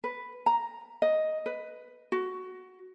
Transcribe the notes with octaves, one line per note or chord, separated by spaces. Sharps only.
B4
A#5
D#5
B4
F#4